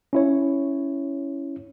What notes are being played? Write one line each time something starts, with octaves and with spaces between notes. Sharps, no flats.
C#4 E4 C#5